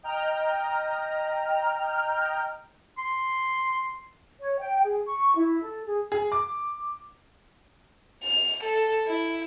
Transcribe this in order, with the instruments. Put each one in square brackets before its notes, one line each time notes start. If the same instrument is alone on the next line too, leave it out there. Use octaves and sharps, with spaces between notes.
[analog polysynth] D#5 G5 A#5 F6
[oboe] C6
[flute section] C#5
G5
G#4
C#6
E4
A4
G#4
[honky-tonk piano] G#4
D6
[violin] F7
A4
E4